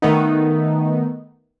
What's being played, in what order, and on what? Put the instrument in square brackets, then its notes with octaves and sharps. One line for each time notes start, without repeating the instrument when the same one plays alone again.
[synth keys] D#3 A3 B3 D#4